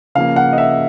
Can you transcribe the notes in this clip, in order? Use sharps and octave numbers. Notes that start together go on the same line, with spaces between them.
C#3 F3 A#3 F5
F#5
D#5
E5